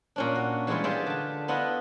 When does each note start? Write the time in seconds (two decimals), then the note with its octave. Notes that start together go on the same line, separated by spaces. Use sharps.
0.16 A#2 C#4 D4
0.35 F#4
0.67 E3 G3 G#3 E4 F4 C#5
0.84 F4 G4 G#4 D5 E5 G5
1.07 D3 A5
1.48 B3 D4 E4 F4 D#5